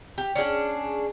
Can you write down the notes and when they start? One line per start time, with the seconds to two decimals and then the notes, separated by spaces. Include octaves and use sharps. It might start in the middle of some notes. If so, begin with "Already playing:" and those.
0.18 G4
0.36 C#4 D4 G4 G#4